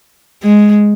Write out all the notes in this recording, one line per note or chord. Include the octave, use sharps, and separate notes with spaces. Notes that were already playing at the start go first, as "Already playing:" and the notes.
G#3